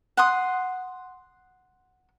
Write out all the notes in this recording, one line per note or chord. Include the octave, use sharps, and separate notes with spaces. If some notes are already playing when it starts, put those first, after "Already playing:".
F#5 C6 D#6